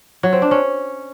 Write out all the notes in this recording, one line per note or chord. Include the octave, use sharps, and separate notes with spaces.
F#3
C4
D4
C#4